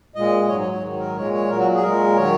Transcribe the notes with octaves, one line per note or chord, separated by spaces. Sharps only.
A#2 G#3 D#5
G#2 F#3 C#5
C#5
C#5
G#2 D#3 F#3
A#4
A#2 G#3 C#5
C#5
A#2 F#3 A#4
F#4
G#4
A#2 G#3 A#4
D#3 F#3 C#5